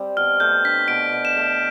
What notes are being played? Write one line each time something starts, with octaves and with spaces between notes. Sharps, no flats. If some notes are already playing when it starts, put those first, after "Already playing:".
Already playing: G3 C4 G4
B2 F6
A3 G6
D4 B6
B2 D7
B2
E7
A3